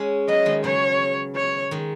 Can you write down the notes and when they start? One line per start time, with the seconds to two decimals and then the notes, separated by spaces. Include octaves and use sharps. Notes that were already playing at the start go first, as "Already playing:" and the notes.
Already playing: G#3 C#4
0.28 F#3 B3 D#5
0.46 D#3 G#3
0.64 C#3 F#3 C#5
1.36 C#5
1.71 D#3 G#3